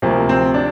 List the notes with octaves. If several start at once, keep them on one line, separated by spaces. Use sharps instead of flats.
D2 C3 F3 A#3
C4
D4